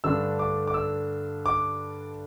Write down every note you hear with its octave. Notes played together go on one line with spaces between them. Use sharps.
G2 D3 A3 D4 E6
D6
D6
E6
D6